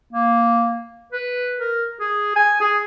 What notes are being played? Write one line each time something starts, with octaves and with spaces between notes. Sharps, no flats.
A#3
B4
A#4
G#4
G#5
G#4